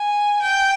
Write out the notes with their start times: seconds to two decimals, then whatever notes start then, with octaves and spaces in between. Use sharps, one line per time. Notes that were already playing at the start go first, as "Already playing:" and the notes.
Already playing: G#5
0.42 G5